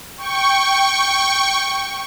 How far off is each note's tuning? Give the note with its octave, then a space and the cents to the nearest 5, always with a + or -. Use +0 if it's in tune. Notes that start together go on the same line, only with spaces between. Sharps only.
G5 +0 C#6 +0